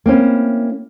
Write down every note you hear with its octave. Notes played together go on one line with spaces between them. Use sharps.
A#3 C4 C#4 E4